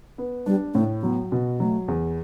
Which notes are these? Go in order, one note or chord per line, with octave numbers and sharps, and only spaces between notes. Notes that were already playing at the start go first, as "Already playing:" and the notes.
B3
G3 D4
A2 A3
F#3 B3
B2
F#3 A3
E2